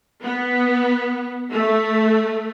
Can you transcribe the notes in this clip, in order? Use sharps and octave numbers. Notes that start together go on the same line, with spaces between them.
B3
A3